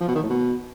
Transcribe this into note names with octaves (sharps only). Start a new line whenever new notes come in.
F3
B2
D#3
A2
B2